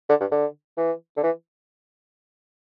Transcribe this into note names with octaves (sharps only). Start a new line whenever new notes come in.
D3
G2
D3
E3
D3
E3